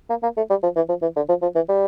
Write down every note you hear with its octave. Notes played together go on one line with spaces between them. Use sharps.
A#3
A#3
A3
G3
F3
E3
F3
E3
D3
F3
F3
E3
G3